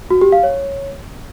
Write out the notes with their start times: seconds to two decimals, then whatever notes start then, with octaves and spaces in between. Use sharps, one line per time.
0.10 F#4
0.21 G4
0.32 F5
0.43 C#5